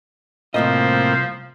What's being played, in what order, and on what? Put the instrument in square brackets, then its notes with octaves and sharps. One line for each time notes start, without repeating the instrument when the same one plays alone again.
[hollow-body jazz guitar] C2 F#2 D#5 [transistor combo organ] A2 A#3 C4 [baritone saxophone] F3